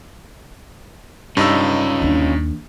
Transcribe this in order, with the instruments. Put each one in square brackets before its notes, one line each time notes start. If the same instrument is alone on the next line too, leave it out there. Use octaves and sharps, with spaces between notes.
[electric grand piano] G2 D#4 E6 [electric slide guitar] C#4 F4
[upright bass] D#2 D4